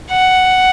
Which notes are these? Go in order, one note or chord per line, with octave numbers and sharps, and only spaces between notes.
F#5